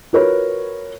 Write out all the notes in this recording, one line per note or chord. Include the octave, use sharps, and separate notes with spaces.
F4 F#4 A#4 B4 C#5